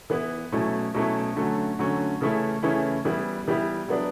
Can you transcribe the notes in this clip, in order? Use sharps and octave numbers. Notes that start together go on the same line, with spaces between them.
E3 B3 E4
B2 F#3 A3 C#4 E4
B2 F#3 A3 C#4 E4
D3 F#3 A3 C#4
D3 F#3 A3 C#4
C#3 E3 A3 C#4 E4
C#3 E3 A3 C#4 E4
E3 G3 B3 E4
E3 G3 B3 E4
F#3 B3 D4